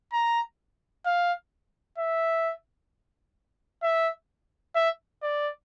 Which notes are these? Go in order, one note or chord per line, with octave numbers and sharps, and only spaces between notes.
A#5
F5
E5
E5
E5
D5